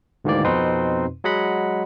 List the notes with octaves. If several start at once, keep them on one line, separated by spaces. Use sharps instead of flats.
D2 G#2 D#3 E3 A#3 D5
F2 B2 C4 D#4 B4 C6
F#3 G#3 D#5 F#5 B5